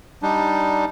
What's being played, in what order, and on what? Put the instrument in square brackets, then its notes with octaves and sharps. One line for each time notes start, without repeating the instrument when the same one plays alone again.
[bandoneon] G3 D4 D#4